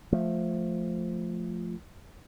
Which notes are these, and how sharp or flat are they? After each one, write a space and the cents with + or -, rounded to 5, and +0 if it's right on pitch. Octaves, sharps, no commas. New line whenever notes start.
F3 +0 A3 +0